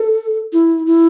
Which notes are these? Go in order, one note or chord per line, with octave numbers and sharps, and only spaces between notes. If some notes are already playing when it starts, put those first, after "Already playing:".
Already playing: A4
E4
E4